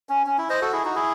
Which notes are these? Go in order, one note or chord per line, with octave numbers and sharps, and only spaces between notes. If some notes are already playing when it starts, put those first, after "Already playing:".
C#4
C#4
E4
C5 D#5
F#4 A4
E4 G#4
D#4 F#4
E4 G#4